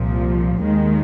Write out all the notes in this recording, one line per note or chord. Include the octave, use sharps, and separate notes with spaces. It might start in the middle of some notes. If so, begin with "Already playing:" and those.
Already playing: C2 A#2 F3
D#2 D#3 G#3